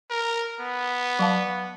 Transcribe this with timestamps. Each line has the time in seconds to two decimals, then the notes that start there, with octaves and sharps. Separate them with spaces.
0.11 A#4
0.60 B3
1.19 F#3 F5 A5